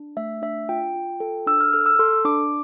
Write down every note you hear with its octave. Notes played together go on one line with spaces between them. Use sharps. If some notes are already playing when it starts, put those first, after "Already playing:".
Already playing: D4
A3 E5
D4 E5
F4 G5
F4
A4
D4 E6
F6
A4 F6
E6
A4 C6
D4 D6